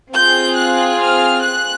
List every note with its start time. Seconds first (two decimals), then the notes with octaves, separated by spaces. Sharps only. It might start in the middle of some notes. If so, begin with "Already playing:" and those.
0.13 C4 F4 G#4 G6
0.56 F#6
1.00 F6
1.43 F#6